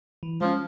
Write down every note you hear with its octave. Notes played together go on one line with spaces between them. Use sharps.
E3
F3 G#3 C#4